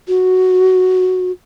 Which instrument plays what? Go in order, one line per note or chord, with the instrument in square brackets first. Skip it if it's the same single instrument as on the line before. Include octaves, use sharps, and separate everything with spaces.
[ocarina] F#4